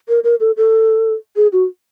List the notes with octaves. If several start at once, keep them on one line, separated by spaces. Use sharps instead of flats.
A#4
A#4
A4
A4
G#4
F#4